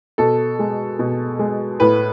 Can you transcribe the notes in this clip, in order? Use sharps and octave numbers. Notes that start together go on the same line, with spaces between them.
B2 A4
G#3
B2
G#3
A2 B4